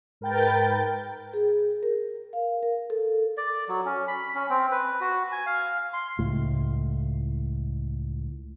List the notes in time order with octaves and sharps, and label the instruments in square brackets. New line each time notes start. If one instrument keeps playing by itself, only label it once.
[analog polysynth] G#2 A#4 B4 G5 G6 A6
[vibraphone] G#4
A#4
F5
A#4
A4
[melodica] D5
F#3
C#4
B5
C#4
C4
B4
F#4
G#5
F5
C6
[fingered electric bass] C#2 A2